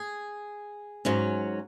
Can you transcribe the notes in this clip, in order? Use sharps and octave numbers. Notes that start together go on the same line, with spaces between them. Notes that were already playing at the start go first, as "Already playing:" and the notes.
Already playing: G#4
G#2 F#3 C#4